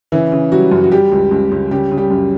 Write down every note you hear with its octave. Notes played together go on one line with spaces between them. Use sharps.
C#3 E3 E4
C#3
F#3 G3 F#4
F#2
F#4
G3 G4
C#2
C#2
C#2
C#3 G3 G4
C#3
G3 G4
F#2